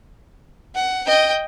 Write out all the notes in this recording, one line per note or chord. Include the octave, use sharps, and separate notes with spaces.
F#5
D#5 G5